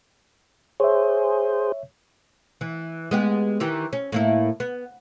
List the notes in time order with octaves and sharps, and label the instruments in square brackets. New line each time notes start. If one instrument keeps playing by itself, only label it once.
[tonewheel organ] G#4 C5 [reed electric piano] C#5 E5
[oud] E3
G#3 B3 G4
D#3 E3 G4
C#4
A2 A#3 E4
B3